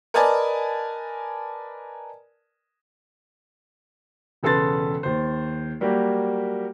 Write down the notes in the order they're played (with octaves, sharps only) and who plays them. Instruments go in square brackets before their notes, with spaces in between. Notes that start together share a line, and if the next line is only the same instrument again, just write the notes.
[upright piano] A#4 B4 D5 D#5 G#5 A5
[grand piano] E1 C#3 A4 B4 C6 A6
D#2 C5
F#3 G3 A#3 F#4 G4